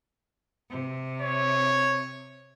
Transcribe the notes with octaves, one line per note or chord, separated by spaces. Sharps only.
C3
C#5